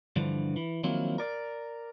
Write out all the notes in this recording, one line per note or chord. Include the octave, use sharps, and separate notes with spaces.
G2 D3 E3 F3
E3
D#3 F3 F#3 A#3 C4 E4
A#4 D5